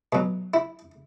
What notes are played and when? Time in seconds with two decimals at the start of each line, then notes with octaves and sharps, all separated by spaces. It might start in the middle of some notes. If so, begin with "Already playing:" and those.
0.13 B2 F#3
0.54 E4